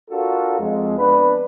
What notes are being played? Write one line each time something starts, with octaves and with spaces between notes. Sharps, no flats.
D4 F4 F#4 A4 A#4
F2 G#3
B3 D4 B4